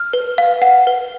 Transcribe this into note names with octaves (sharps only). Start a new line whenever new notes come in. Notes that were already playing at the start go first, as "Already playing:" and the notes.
Already playing: F6
B4
F5
F#5
B4